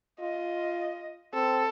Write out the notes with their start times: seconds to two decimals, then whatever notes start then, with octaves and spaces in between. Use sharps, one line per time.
0.20 F4 D#5
1.33 C4 A4